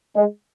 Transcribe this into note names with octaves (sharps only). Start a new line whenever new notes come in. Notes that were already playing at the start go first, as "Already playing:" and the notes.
G#3